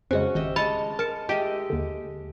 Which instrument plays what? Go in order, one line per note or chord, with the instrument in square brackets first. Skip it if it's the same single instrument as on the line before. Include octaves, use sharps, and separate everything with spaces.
[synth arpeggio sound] F2 C#3 G#3 [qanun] C#4 F#4 [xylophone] C5
[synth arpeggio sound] G#1 [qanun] G4 D#5 E5
[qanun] G#3 D#5 C#6 [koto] A5 [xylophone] B5
[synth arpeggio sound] A#4 C#7 [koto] A5
[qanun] G#3 D#5 E5 [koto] G4
[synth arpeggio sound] D#2 D3